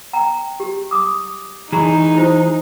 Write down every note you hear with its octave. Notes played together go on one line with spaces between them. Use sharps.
G5 A#5
G4
D6 D#6
E3 D#4 G#4 A#5 B5 C#6
E4 F4 C5